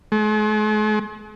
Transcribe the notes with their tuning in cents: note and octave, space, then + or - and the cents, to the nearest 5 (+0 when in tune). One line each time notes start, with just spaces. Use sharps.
G#3 +45